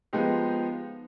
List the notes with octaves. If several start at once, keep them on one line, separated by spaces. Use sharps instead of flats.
F3 G#3 B3 D#4 G4